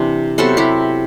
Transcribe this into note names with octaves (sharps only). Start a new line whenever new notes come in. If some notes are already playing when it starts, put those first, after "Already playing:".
Already playing: C3 E3 D4
C3 F#3 B3 F#4 A4
E4 G4